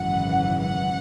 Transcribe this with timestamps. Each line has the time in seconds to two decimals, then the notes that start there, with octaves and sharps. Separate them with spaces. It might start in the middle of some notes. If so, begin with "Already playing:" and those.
Already playing: G#1 F#2 C#3 E3 F#5
0.62 F#5